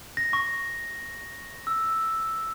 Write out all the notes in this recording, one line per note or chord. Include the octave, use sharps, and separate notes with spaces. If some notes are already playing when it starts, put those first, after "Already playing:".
A#6
C#6
E6